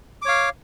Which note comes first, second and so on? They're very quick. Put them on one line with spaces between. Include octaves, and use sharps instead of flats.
D6 C#5 F5